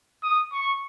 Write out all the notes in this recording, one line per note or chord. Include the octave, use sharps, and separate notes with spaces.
D#6
C#6